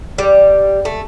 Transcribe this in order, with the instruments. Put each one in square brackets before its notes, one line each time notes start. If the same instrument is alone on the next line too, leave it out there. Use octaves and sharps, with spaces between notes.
[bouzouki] G3
A3